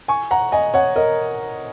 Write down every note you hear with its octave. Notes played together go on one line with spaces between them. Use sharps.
G#5 C#6
F#5 A#5
D#5 G#5
C#5 F#5
A#4 D#5